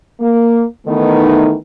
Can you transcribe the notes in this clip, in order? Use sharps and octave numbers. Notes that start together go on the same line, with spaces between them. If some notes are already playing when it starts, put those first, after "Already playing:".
A#3
D#3 E3 A3 B3 D#4